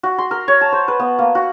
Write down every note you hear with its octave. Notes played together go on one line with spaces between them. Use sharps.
F#4
C6
A#4
C#5
A5
C5
B4
B3
A#3
F#4